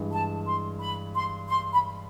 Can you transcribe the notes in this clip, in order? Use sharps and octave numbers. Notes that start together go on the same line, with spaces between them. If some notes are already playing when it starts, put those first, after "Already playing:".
Already playing: G2 E3 G#3
A5
C6
B5
C6
C6
B5